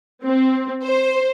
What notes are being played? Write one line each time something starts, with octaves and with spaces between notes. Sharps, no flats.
C4
C5